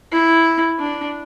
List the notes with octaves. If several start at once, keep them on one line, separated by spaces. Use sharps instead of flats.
E4
D4